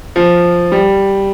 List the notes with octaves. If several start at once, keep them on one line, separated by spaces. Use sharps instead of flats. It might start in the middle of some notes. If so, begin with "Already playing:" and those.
F3
G3